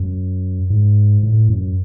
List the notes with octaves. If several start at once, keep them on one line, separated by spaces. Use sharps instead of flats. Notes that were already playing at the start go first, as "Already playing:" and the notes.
Already playing: F#2
G#2
A2
F#2